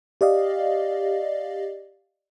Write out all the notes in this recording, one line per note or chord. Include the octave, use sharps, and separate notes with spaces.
G4 D5 D#5 F5